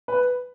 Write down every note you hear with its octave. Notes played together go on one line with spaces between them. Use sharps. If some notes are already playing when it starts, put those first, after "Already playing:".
B4